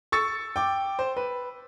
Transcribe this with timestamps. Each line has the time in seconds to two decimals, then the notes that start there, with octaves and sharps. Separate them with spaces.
0.12 C#6 E6 A6 C#7
0.56 G5 D6
0.99 C5
1.17 B4